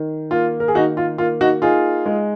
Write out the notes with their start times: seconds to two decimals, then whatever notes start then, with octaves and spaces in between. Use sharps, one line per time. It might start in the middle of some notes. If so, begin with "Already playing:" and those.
Already playing: D#3
0.31 A#3 F4
0.60 A#4
0.68 G#4
0.75 D#3 D#4 F#4
0.97 F4
1.18 A#3 F4
1.41 D#4 F#4
1.62 D#4 F4 G#4
2.06 G#3